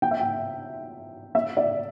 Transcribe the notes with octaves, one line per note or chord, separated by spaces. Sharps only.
G5
E5
G5
E5
D5